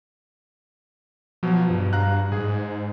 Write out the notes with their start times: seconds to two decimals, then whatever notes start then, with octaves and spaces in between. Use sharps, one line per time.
1.43 B2 F3 F#3
1.70 G2
1.93 F5 A#5 F#6
2.32 G#2 G#4